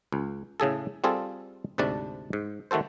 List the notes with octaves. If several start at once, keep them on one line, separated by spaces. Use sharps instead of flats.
C#2
A2 C#3 G#4 A4
G3 C4 F4 G#4 A4
D2 G#2 C3 D4 A5
G#2
D#3 A3 F#4 A4 C5